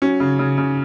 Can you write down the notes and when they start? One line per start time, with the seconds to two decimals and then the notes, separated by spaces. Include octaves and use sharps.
0.02 F#3 C#4
0.20 C#3
0.39 C#3
0.58 C#3